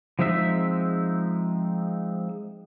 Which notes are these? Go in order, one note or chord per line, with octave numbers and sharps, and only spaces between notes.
F3 G#3 C4 D#4 E5